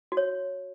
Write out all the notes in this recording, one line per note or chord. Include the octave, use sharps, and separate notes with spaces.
F#4
C#5